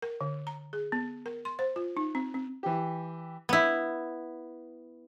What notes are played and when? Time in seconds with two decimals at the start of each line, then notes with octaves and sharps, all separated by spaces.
0.02 A#4
0.21 D3
0.47 A#5
0.73 G#4
0.92 B3
1.26 A#4
1.45 C6
1.59 C5
1.76 F4
1.97 D#4
2.15 C4
2.34 C4
2.63 E3 G4
3.49 B3 E4